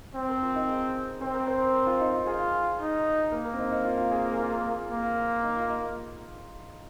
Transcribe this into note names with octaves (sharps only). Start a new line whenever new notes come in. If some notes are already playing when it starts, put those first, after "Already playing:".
C4
A#4
F4
D#4
G#4
C4 C5
A#4
C5
A#4
F4
D#4
F4
F4 G#4
D#4
A#3 A#4
A#4
C4
D#4
D#4
F4
F4
G#4
A#4
G#4
F4
G#4
A#3
D#4
F4
D#4